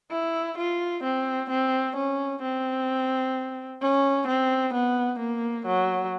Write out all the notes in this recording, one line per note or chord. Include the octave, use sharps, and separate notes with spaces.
E4
F4
C4
C4
C#4
C4
C#4
C4
B3
A#3
F#3